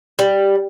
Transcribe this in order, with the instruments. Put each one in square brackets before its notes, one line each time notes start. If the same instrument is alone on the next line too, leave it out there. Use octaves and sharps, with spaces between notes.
[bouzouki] G3